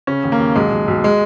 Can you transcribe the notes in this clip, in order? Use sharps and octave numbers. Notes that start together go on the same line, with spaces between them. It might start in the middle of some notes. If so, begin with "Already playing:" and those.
C#3 C#4
D#2
A#3
D#2
B1 G#3
B1
B1
G#3